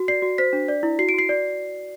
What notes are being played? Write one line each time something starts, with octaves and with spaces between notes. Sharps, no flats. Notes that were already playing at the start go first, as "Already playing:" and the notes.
Already playing: F#4
D5 C7
F#4
C5 B6
D4
D5
E4
F#4 C7
D7
F#4 C7
D5